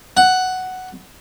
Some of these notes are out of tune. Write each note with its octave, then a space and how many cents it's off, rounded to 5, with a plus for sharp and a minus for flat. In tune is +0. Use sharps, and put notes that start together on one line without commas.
F#5 +5